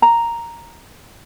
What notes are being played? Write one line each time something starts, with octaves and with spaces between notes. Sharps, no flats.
A#5